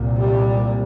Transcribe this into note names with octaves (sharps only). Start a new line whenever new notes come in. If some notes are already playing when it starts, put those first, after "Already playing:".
Already playing: C2 A#2
G3